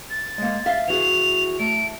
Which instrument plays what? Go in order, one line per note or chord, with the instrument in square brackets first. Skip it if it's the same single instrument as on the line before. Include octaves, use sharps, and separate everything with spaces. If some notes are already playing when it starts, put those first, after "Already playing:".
[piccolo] A6
[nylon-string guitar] G#3 A#3
E5 F5
[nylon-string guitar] E3 F#4 G#4 [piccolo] F7
[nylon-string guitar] A3 [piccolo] D7